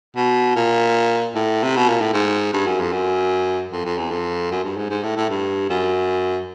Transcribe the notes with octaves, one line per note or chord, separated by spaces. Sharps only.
B2
A#2
A2
C3
B2
A#2
A2
G#2
G2
F#2
F2
F#2
F2
F2
E2
F2
F#2
G2
G#2
G#2
A2
A2
G2
F#2